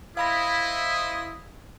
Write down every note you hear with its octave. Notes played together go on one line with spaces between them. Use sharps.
E4 C5 D#5 F5 B5 D#6 A#6